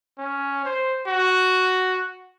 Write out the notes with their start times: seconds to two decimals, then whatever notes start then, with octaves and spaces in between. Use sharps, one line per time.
0.19 C#4
0.65 C5
1.07 F#4